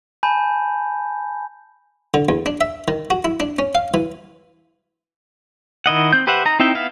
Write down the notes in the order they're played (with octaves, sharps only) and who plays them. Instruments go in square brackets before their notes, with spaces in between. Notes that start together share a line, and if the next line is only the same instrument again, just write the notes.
[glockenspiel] G#5 A5 B5 G6
[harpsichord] D3
E2
D4
E5
D#3
F#4
E4
D4
C#4
F5
E3
[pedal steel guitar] D#3 E4 D#5 F#5
C4 G6
G4 B4 C5 E5 F#5
D#4 A#5
C4 D#4 E4 E5 G5
B3 E4 E5 F5